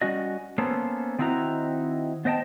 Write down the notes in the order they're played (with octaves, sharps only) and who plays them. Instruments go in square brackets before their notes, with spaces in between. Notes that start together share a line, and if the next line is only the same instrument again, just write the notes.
[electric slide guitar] G3 C#4 F#4 D#5
A#3 B3 C#4 A4 C5
D#3 C4 D#4 E4 F#4 A#5
B3 C5 D#5 G5 A5